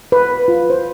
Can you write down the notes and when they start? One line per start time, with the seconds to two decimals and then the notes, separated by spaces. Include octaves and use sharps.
0.12 B4
0.48 F4
0.70 C5